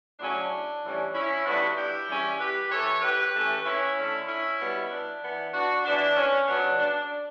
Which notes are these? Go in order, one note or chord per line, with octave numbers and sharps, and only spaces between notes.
A2 F#3 C#4 D4
A2 E3 G3 C#4
C#4 E4
D3 G3 B3 D4 F#4
E4 G4
E3 G3 C#4
G4 B4
E3 B3 A4 C#5
G4 B4
E3 A3 C#4
C#4 E4
D3 A3 C#4
C#4 E4
B2 G3 B3
D4
E3 B3
D4 F#4
E3 B3 D4
C#4
C#3 F#3 B3 D4
D4